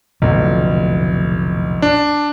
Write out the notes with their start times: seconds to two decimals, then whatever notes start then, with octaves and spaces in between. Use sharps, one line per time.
0.22 F1 B1 F2 A2 D3
1.82 D4